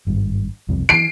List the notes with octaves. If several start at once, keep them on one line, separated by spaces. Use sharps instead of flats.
G#1 G2
E1 C2 F2
D#3 E3 C7 D7